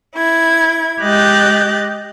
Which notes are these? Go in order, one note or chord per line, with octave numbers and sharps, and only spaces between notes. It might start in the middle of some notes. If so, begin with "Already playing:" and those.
E4 G#6
G#3 G4 D#5 F#6 G6 A6